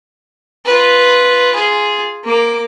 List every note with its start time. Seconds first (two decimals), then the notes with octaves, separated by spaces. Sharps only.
0.66 F4 B4
1.54 F4 G#4
2.24 A#3 D6